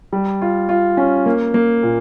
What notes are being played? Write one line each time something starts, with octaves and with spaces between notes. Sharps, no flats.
G3
F4
F4
C#4
A#3
A#3
A#2